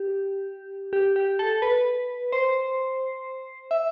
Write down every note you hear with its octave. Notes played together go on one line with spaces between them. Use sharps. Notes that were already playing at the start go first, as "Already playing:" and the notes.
Already playing: G4
G4
G4
A4
B4
C5
E5